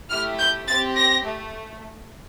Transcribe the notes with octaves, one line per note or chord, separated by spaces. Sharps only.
A3 E4 G4 F6
G6
C4 G4 A6
A#6
A3